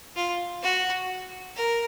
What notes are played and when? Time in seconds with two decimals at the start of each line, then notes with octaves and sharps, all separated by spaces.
0.16 F4
0.62 F#4
1.56 A#4